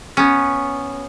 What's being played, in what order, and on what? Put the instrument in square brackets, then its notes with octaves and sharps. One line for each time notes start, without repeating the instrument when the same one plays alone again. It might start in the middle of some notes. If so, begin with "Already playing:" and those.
[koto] B3 C#4